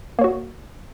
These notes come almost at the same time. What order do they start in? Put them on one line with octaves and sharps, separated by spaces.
A#3 C#5 F#4